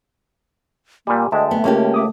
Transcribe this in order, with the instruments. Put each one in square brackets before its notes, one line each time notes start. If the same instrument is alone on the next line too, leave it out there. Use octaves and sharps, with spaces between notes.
[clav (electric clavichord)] A#2 G3 [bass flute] A#3 [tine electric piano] G4 G#5
[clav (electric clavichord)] D2 G#3 [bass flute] D#5 [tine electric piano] E5 G5 A5
[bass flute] A3 [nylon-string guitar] B3
[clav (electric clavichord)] C#2 [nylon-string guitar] A#3 C#4 G4
[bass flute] A3 [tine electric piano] E5 D6 D#6